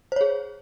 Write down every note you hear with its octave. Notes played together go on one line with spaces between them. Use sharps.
G#4 C5 C#5